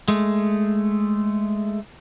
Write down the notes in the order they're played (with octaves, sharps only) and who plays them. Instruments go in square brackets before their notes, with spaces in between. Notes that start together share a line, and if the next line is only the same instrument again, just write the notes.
[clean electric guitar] G#3 A3